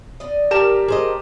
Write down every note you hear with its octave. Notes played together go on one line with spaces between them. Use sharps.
D5 D#5
G4 A#4 A5 E7
G#4 C5 D#5